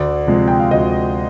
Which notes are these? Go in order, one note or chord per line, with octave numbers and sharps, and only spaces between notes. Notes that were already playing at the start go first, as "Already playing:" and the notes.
Already playing: D2 D5
C3 F3 G#3
G5
F5
D2 D#5